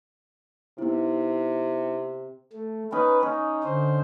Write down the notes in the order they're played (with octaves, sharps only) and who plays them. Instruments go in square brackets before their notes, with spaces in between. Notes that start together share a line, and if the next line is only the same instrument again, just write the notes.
[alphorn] C3 [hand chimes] B3 D#4 E4
[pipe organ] A3
[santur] C#4 D#4 [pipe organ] B4
[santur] C#4 [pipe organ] D#4
[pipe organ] D3 C5